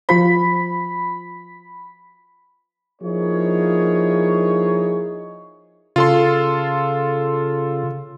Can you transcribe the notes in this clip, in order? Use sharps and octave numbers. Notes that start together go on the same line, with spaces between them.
F3 F4 C5 B5
F3 A#3 D#4 E4 G#4 C#5
C#3 F4 A4 C6